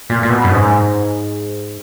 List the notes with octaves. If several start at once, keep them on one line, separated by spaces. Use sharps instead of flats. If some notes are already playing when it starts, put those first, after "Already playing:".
A#2
A#2
B2
F#2
G#2